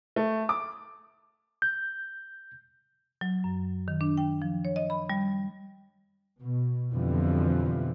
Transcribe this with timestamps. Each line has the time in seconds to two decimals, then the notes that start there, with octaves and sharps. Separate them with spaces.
0.16 A3
0.49 D6
1.62 G6
3.21 F#3
3.44 F#2
3.88 D#3
4.01 D4
4.17 G5
4.42 F3
4.65 C#5
4.76 D#5
4.90 B5
5.10 G3
6.41 B2
6.93 F2 B2 D3 E3 F3 G3